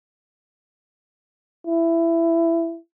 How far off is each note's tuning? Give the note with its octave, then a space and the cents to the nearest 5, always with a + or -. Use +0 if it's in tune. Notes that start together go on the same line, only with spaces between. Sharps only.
E4 +15